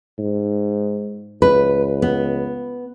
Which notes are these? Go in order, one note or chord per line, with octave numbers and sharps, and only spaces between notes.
G#2
C#2 B4
B3